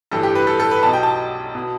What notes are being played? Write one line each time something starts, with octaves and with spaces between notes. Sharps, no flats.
A1 G2 E3 A4
G4
B4
A4
A4
B4
B1 B2 A5
G5
A5
B2